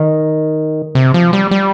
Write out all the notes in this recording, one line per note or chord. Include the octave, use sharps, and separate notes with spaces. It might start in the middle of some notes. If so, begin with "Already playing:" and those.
Already playing: D#3
C3
F3
G3
G3